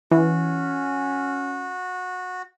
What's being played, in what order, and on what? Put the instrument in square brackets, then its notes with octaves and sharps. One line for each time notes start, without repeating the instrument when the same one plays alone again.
[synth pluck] E3 [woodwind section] C#4 [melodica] F#4